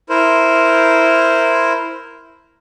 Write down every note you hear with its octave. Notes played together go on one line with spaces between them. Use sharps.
E4 A#4 C5